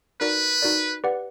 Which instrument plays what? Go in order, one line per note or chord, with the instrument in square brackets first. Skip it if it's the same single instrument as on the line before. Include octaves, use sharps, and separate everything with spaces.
[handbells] D#4 F#4 A#4 D5 [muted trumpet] B4
[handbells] D#4 F#4 A#4 D5
G4 B4 D5 F#5